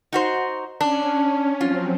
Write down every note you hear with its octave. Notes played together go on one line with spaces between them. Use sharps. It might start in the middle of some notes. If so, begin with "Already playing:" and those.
D#4 F#4 C5
C#4 D4
F3 F#3 C4 F4